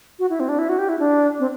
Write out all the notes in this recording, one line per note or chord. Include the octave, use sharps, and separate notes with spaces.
F#4
E4
C4
D4
E4
F#4
G4
E4
D4
C4